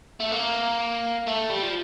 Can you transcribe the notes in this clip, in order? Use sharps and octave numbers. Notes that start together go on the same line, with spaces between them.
A3
A#3
A3
G3
F3